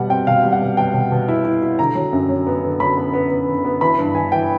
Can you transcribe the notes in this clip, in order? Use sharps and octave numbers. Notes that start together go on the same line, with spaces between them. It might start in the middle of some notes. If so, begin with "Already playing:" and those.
Already playing: B2 G3 F#5
C4 G5
B2 F5
G3
F#5
B2
B2 G5
B2
B2
E4
E4
E4
D3 A#5
F#3
F#2
F#3
B3
D3
F#3 B5
B3
B3
B3
D3
B3
E3 B5
G2
E3 G#5
E3 G5